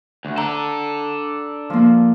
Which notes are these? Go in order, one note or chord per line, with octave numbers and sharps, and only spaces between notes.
D2
D4 A4 A#5
F3 A#3